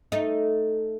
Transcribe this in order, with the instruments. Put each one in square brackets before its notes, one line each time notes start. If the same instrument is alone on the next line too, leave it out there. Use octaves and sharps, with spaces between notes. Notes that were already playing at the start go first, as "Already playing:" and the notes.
[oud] A3 D#4